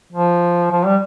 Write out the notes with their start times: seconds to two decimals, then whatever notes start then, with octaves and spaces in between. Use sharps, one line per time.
0.13 F3
0.72 F3
0.86 G3